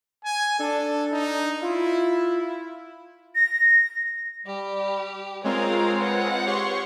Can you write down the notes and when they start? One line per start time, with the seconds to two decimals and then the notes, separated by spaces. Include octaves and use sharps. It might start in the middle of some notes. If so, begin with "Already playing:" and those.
0.25 G#5
0.59 D4 A4
1.11 D#4
1.62 E4 F4
3.35 A#6
4.46 G3 G4
5.44 G#3 C4 F4 A#4 C#5 F5
6.01 B4 C#5 F#5
6.46 G4 C#5 C6 C#6